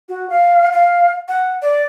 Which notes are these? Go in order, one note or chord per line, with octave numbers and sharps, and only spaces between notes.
F#4
F5
F5
F#5
D5